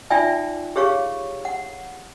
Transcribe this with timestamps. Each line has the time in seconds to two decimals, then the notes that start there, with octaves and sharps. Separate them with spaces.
0.10 D#4 F4 D5 E5 G5 G#5
0.76 G4 G#4 C#5 F5 C#6
1.45 F#5